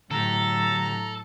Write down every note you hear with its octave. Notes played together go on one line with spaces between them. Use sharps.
A2 D3 F#3 G4 A4 A#5